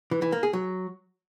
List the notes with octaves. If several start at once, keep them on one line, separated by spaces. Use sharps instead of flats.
E3
E3
A#3
G#4
F#3